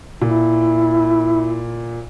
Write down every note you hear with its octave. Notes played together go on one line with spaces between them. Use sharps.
A#2 E4